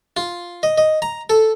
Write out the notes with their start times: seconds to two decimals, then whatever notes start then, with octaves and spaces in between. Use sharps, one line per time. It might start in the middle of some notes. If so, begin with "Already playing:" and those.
0.17 F4
0.63 D#5
0.78 D#5
1.02 A#5
1.30 A4